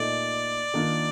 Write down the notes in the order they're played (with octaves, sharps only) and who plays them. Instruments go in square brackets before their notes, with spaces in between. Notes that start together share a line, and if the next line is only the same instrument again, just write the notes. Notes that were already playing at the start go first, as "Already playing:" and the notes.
Already playing: [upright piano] A#2 A3 D#4 [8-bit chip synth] D5
[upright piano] D#3 A#3 D4 F4